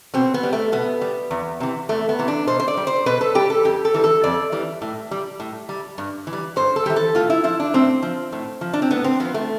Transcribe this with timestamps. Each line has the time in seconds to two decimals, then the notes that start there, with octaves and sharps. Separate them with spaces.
0.14 B2 C4
0.34 B3
0.43 G3
0.53 A3
0.72 B2 B3
1.02 G3
1.31 E2
1.60 C3 E3
1.89 E2 A3
2.09 B3
2.19 C3 E3
2.28 D4
2.47 B2 C5
2.60 C5
2.68 D5
2.77 G3
2.87 C5
3.06 B2 B4
3.21 A4
3.35 G3 G4
3.50 A4
3.64 F2 G4
3.85 A4
3.94 E3 G3
4.04 A4
4.24 F2 D5
4.52 E3 G3
4.82 A2
5.11 G3
5.40 A2
5.69 G3
5.98 G2
6.27 E3
6.33 G3
6.56 G2 C5
6.76 A4
6.86 E3 G3 G4
6.96 A4
7.15 A2 F4
7.30 E4
7.44 F3 E4
7.60 D4
7.74 A2 C4
8.02 F3
8.32 A2
8.61 F3
8.73 D4
8.82 C4
8.90 A2 B3
9.04 C4
9.20 F3 B3
9.34 A3